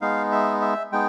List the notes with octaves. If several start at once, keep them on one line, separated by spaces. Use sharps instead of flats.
G#3 B3 D#4 F5
E5
E5
G#3 B3 D#4 G5